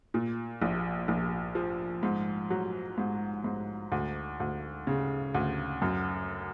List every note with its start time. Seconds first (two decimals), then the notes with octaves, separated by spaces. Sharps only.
0.14 A#2
0.62 A#1
1.08 A#1
1.55 F3
2.03 G#2
2.50 F#3
2.98 G#2
3.44 G#2
3.92 D2
4.40 D2
4.87 C#3
5.34 D2
5.82 F#2